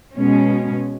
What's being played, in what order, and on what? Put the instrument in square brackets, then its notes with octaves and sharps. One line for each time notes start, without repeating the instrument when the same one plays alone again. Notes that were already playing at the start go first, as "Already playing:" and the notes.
[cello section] B2 G#3 C#4